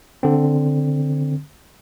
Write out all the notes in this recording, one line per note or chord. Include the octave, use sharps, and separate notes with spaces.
D3 C4